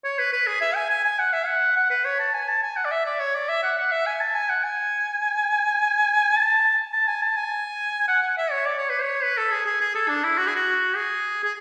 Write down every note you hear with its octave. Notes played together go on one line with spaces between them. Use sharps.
C#5
B4
B4
G#4
E5
G#5
G#5
G#5
F#5
E5
F#5
F#5
B4
C#5
A5
G#5
A5
G#5
F#5
D5
E5
D5
C#5
D5
E5
F#5
F#5
E5
G#5
A5
G#5
F#5
G#5
A5
A5
G#5
A5
G#5
F#5
F#5
E5
C#5
D5
C#5
B4
C#5
B4
A4
G#4
G#4
G#4
A4
D4
E4
F#4
G#4
F#4
G#4
G#4